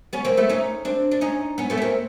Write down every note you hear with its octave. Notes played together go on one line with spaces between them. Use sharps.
B3 C#4
A#3 C4
A3 B3
C#4 D#4
C4 D4
D4
C#4 D#4
B3 C#4
A3 B3
C#4
A#3 C4